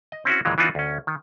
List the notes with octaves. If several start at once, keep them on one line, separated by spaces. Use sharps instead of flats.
D#5
C4 C#4 E4 F#4
D#2 A#2 E3 F#3 G#3
E3 B3 D4 D#4 F4 F#4
D2 C#4
D#3